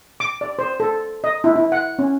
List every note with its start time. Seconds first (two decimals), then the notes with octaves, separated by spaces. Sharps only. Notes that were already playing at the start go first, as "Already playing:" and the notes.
0.20 D6
0.41 D5
0.59 C5
0.80 A4
1.24 D#5
1.44 E4
1.56 E4
1.72 F#5
1.99 C#4